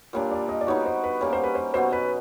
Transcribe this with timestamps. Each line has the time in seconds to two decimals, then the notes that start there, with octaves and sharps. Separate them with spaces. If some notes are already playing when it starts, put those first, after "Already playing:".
0.13 A#2 G3 A#3 D4 C#5
0.31 D5
0.49 D#5
0.61 D5
0.67 G3 B3 D#4 F#4 C#5
0.86 C5
1.04 B4
1.21 G3 A#3 C#4 C#5
1.33 C5
1.44 B4
1.55 C5
1.74 B2 F#3 B3 C5
1.93 B4